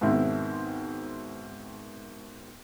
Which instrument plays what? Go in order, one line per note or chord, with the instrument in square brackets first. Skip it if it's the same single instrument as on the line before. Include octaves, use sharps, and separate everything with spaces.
[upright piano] G#2 B2 D#3 C4 E4